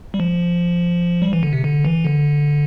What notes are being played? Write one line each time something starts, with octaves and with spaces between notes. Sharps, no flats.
G3
F3
G3
E3
D3
C3
D3
E3
D3